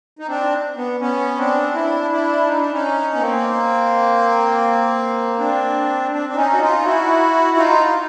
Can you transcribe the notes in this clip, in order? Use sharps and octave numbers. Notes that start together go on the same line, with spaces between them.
D#4
C4 D4
B3
B3 C#4
C4 D4
D4 E4
D4 E4
D#4
D4
C#4 D#4
B3
A#3 C4
C4 D4
C4 D4
D4
C#4 D#4
F#4
D#4 F4
E4 F#4
D#4 F4
D#4